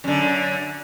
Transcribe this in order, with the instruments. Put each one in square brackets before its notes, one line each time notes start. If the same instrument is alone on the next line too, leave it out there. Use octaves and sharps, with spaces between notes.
[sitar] F#2 D3